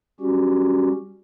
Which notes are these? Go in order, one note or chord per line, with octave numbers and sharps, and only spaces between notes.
G3 C#4 F#4 G4